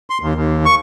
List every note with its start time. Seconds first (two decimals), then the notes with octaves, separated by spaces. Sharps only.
0.10 C6
0.22 D#2
0.35 D#2
0.66 C#6